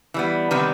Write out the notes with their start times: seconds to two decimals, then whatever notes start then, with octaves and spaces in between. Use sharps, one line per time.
0.14 E3 G3 B3
0.51 C3 D#3 G3 B3 B4